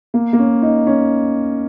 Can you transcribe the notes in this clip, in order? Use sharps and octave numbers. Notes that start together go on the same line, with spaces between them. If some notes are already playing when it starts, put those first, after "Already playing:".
A#3
A#3
C#4
D#4
C#4